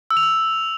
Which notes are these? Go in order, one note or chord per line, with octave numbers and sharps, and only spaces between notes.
E6
F7
E6